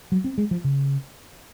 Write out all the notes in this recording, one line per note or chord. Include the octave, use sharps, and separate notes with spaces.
F#3
C4
G#3
F3
C#3